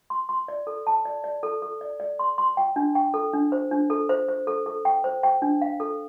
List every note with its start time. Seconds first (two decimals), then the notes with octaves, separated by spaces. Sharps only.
0.10 C6
0.29 C6
0.48 D5
0.67 A4
0.87 A5
1.05 D5
1.24 D5
1.43 A4
1.62 A4
1.81 D5
2.00 D5
2.19 C6
2.38 C6
2.57 G5
2.76 D4
2.95 G5
3.14 A4
3.33 D4
3.52 C5
3.71 D4
3.90 A4
4.09 C5
4.28 C5
4.47 A4
4.66 A4
4.85 G5
5.04 C5
5.23 G5
5.42 D4
5.61 F5
5.80 A4